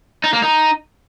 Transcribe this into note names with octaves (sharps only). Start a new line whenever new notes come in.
D#4
A#3
D#4